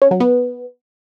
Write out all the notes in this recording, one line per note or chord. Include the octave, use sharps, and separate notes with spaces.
C#4
F#3
B3